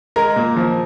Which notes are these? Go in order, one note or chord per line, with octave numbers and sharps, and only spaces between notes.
G#3 A#4
A#2
F3